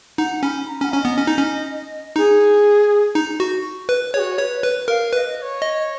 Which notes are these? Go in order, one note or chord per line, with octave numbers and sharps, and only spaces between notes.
D#4 F#5
C#4 B5
A#5
C#4 F#5
C#4 C#5
B3 D#5
C#4
D#4
C#4
D#4 G#4
D#4
F#4
B4
F#4 G#4 C#5
B4 C#5
B4
A#4 F5
B4 D#5 F5
D#5
C#5
D#5